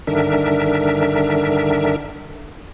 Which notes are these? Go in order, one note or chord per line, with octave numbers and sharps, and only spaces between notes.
G2 D3 D#3 D4 A#4 E5